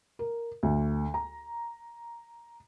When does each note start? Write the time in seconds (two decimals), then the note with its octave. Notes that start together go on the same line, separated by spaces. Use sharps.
0.19 A#4
0.63 D2
1.14 A#5